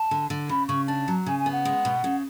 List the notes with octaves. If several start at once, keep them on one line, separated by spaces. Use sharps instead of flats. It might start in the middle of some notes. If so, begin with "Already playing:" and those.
Already playing: A5
D3
D3
C#3 B5
C#3 C#6
D4 A5
F#3
C#3 G#5
G#5
B3
F#5
G#3
B2
C#3